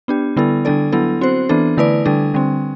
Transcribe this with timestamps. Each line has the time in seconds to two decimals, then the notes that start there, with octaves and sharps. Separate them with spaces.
0.08 B3 D4 G4
0.36 D3 G3 B3 E4 A4
0.65 D3 G3 D4 A4 D5
0.92 F#3 B3 E4 A4
1.21 C4 F#4 C5
1.49 E3 B3 D4 A4
1.77 D3 A3 E4 B4 D5
2.05 D3 G3 D4 A4
2.34 D3 G3 C4